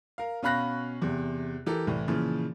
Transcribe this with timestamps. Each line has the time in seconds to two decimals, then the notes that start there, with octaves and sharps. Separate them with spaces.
0.18 A#4 F5
0.42 B2 C#4 F5 B5 F#6 A#6
1.02 E2 C3
1.66 E3 G4 A4 A#4
1.87 C2 A2 E3
2.08 A#2 C#3 E3 F3